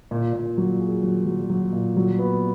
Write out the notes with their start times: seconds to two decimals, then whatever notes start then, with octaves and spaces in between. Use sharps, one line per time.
0.11 A#2
0.33 A#2
0.57 F#3
0.80 G#4
1.03 F#3
1.26 F#3
1.50 F#3
1.73 A#2
1.96 F#3
2.19 B3